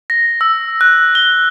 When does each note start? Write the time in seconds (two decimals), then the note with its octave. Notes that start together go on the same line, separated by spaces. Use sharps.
0.10 A#6
0.41 E6
0.81 F#6
1.15 G7